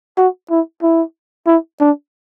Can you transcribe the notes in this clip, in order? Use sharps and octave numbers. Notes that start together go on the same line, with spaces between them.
F#4
E4
E4
E4
D4